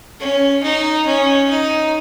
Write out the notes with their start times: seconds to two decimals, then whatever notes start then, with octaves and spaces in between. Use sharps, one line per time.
0.20 C#4
0.63 D#4
1.06 C#4
1.50 D#4